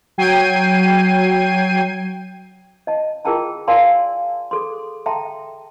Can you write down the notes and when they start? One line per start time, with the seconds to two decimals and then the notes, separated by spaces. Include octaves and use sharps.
0.18 F#3 G5 G#6 C7 D#7
2.87 D#5 A5
3.25 F4 G#4 A#4 G5 A5 A#5
3.68 A#4 D5 F5 G#5 A5 C6
4.51 G#4 A4 C6
5.06 A4 E5 G5 A5 A#5 C6